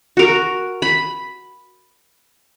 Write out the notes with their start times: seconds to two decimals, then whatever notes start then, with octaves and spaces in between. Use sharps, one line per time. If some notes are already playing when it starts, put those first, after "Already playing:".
0.17 F#4 A#4
0.82 B5